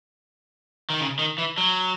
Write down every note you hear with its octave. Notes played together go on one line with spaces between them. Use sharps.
D#3
C#3
D#3
E3
F#3